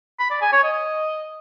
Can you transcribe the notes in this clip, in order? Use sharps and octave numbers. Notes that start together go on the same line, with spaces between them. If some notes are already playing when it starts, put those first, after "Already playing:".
B5
D5
G#5
C#5
D#5